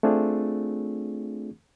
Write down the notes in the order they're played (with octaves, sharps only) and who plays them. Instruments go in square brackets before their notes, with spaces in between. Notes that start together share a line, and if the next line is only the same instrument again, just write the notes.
[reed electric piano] A3 C4 D4 F4 G#4